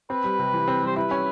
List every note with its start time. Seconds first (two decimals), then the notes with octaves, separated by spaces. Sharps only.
0.10 C4 B4
0.24 G3
0.39 C3
0.53 E3
0.68 C4
0.82 G3 C5
0.96 E4 B4
1.11 C#4